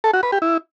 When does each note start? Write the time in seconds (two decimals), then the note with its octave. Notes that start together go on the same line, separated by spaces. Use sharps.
0.04 A4
0.13 F#4
0.23 B4
0.32 G4
0.42 E4